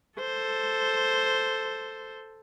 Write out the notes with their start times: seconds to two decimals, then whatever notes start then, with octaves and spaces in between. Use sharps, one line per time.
0.19 A4 C5